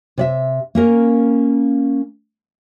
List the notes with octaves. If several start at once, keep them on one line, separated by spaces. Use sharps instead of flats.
C3 D5 E5
A#3 C#4 A#4